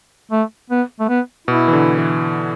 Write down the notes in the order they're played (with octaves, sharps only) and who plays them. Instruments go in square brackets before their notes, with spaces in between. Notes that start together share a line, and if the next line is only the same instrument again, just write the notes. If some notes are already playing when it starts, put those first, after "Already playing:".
[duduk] A3
B3
A3
B3
[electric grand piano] B2 [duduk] E4
[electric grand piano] E3
D3
E3